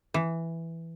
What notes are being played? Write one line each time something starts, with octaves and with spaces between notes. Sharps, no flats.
E3